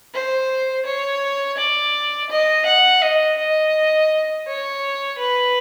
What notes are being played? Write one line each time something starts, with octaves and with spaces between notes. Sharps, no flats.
C5
C#5
D5
D#5
F#5
D#5
D#5
C#5
B4